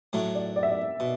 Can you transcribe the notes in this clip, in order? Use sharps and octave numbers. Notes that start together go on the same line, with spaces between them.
A2 F#3 A3 D4
D5
D5
E5
D5
B2